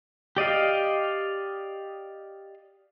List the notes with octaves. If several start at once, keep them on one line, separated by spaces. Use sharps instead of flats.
G4 D5 D#5 F5